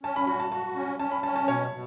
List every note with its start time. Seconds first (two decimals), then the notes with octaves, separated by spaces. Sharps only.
0.03 C#4 A5
0.16 B5
0.27 F#4 B5
0.40 A5
0.51 F#4 A5
0.76 C#4
0.99 C#4 A5
1.12 B5
1.23 C#4 A5
1.35 A5
1.47 B2 C#5
1.71 B2